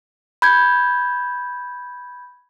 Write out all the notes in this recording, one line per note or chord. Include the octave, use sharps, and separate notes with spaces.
B5 G6 G#6